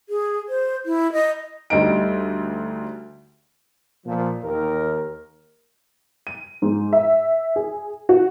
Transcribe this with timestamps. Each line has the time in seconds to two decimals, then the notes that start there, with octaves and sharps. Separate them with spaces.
0.09 G#4
0.49 C5
0.86 E4
1.12 D#5
1.70 D2 G3 D#4 D#5 D7
4.05 A#2 F3
4.43 D#2 A#4
6.27 D#7
6.62 G#2
6.93 E5
7.56 G#4
8.09 F#4